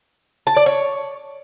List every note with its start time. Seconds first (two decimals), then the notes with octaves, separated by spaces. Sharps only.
0.47 A5
0.56 D5
0.66 C#5